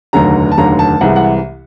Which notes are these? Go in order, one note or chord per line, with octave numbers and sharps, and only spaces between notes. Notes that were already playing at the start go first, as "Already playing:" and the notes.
F1 D#2 D3 F#3 A#5
A5
F1 D#2 D3 F#3 A#5
A5
C2 C3 E3 G#3 F#5
F#5